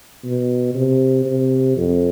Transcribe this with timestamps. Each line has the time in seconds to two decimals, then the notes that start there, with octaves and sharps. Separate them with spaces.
0.24 B2
0.74 C3
1.26 C3
1.76 F2